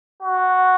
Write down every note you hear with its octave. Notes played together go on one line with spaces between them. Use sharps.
F#4